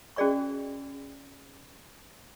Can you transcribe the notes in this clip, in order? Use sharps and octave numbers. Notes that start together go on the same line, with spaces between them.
C#4 F#4 G#4 D5 D#5 C#6